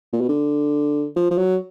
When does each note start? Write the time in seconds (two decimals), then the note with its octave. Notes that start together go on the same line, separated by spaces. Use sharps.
0.12 A#2
0.21 B2
0.29 D3
1.16 F3
1.31 F3
1.38 F#3